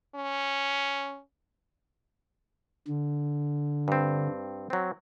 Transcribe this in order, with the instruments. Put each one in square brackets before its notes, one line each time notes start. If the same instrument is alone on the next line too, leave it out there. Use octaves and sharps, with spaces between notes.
[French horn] C#4
[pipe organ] D3
[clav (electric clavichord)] G2 C4
F#3 C4